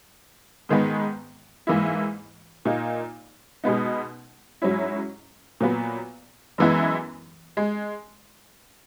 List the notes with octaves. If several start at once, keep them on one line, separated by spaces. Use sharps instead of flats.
G#2 D#3 G#3 B3
G#2 E3 A#3 E4
A#2 A#3 D#4
B2 G#3 B3 D#4
G#2 F#3 C#4 E4
A#2 F#3 B3
F#2 E3 G#3 B3 E4
G#3